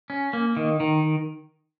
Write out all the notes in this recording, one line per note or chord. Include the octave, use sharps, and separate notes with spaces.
C#4
A#3
D#3
D#3